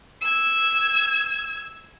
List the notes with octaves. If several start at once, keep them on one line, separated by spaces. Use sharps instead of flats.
E6 G#6